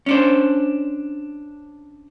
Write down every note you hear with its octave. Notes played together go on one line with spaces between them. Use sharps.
C#4 D4 C5